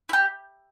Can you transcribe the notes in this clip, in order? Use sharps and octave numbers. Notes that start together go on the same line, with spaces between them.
E4
G4